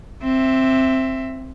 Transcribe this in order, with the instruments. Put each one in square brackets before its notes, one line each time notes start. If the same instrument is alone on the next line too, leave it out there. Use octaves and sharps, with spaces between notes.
[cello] C4 E5